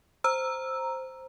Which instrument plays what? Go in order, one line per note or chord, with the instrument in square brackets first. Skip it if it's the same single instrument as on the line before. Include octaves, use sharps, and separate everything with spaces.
[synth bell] C5 A#5 E6